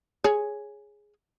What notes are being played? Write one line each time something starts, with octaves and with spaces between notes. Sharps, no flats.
G#4 C#5